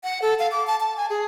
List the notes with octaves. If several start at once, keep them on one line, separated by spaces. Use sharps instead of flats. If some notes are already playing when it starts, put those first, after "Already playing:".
F#5
A4
F5
D6
A5
A5
G#5
G#4